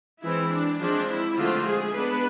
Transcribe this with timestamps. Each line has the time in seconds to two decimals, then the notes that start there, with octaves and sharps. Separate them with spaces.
0.23 E3 G#3 C4 E4
0.52 D4
0.81 F3 G#3 C4 D4
1.09 E4
1.38 D3 F3 A3 C4 F4
1.67 G#3 G#4
1.96 G#3 B3 D4 B4